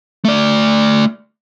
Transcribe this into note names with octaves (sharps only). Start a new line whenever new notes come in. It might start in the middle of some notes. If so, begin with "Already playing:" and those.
A3 D5